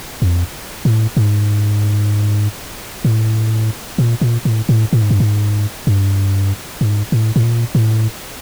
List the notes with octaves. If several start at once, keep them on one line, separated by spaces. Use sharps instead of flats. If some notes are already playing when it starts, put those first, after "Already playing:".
F2
A2
G#2
A2
A#2
A#2
A2
A2
A2
G#2
G2
G#2
G2
G#2
A2
A2
A#2
A2